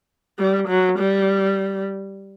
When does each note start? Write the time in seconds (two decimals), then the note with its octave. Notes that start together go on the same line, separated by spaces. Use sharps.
0.39 G3
0.68 F#3
0.98 G3